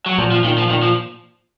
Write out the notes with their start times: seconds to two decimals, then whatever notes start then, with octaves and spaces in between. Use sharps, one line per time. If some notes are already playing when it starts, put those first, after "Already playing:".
0.06 F#3
0.18 A#2 F3
0.32 F3
0.44 A#2 D#3
0.58 F3
0.70 A#2 D#3
0.83 F3